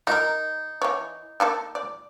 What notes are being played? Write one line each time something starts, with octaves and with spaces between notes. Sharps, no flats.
D#3 D#4 A#4
E3 C#5
D#3 A#3 A4
D5